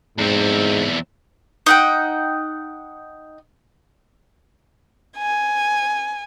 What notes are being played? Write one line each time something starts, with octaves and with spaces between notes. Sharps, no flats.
E2 G#2 C4
D#4 F#5 G5
G#5